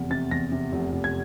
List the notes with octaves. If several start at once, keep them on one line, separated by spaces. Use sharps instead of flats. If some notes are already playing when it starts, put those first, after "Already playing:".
Already playing: F1 E2 C3
C3 A6
E2 A#6
C3
F1
F1
G#6